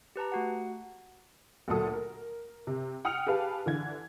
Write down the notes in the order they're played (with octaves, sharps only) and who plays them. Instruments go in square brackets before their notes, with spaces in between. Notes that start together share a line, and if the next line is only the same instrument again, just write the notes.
[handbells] G4 B4 A5 A#5
A3 F#4 F#5
[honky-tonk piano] D2 A#2 F#3 A4 D#6
A#4
C3
F#5 G5 D#6 F6 C#7 F7
G4 G#4 B4 F5 A5
D3 E3 G#6